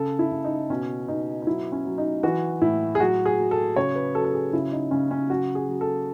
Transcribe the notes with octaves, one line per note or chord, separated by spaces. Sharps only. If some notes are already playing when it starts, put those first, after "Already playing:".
Already playing: C#3 A4
E4
C#3
D#4
B2 C#4
B2 D#4
D#4
F#3 E4
C#4
F#3
D#4
E3 F#4
A2 E4
G#4
F#3 F#4
G#4
F#3
A4
C#3 C#5
B4
F#3 A4
A4
G#4
C#3 E4
D#4
C#3 C#4
C#4
F#3 F#4
G#4
F#3
A4